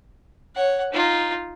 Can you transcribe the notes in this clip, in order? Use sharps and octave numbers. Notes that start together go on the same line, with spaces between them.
C#5 F#5
D#4 F4